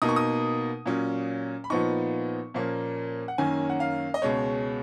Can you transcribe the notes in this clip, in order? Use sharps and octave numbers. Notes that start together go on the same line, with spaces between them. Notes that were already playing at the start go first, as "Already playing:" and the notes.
B2 A#3 D#4 D#6
C#6
D#6
A#2 F#3 C#4
B5
A#2 F3 B3 D#4 C#6
A#2 F3 A#3 C#4
F#5
F#2 D#3 A#3 C#4 G#5
F#5
F5
D#5
C#2 B2 G#3 C#5